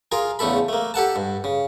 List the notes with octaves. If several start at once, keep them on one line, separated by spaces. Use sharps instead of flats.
F4 G#4 A#4
E2 C#3 A3 A4 B5
A3 A#3
G4 A4 F#5 A5
G2
C#3